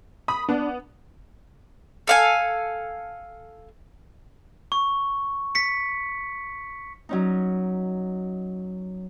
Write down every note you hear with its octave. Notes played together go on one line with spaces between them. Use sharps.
B5 D#6
B3 D4
A4 F5 G#5
C#6
B6 C#7
F#3 C#4 D#4